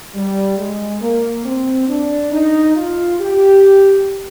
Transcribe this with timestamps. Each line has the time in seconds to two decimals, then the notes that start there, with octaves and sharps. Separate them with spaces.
0.15 G3
0.58 G#3
1.01 A#3
1.45 C4
1.89 D4
2.32 D#4
2.76 F4
3.20 G4